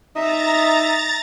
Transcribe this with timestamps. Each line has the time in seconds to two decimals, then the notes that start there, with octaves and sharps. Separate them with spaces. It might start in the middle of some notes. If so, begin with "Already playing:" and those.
0.16 D#4 E5 A#5 A6